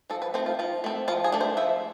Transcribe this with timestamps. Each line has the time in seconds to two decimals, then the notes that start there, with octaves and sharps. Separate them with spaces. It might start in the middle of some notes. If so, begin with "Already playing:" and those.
0.10 F3 A4
0.22 B4
0.34 A3 C4 C5
0.46 F4
0.59 F3 F4
0.84 A3 C4
1.08 F3 F4
1.24 G#4
1.32 A3 D4
1.41 C5
1.57 F3 E5